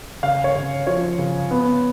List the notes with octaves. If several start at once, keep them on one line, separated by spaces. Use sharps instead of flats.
C#3 F5
C#5
C#3
F3 C#5
C#3
B3